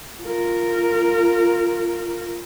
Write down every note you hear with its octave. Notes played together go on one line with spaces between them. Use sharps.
F4 A#4